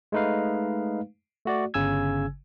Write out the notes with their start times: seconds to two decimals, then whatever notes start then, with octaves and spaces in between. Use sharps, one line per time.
0.12 G#3 A3 D#4 B4 F5
1.45 A3 F#4 D5
1.74 G1 C#3 G#5 E6 G#6